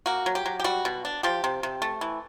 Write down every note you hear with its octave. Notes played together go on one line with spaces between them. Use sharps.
A#3 F#4
F#3
G4
F#3
G4
G3 F#4
B2
D4
F3 G4
C3
C3
A3
E3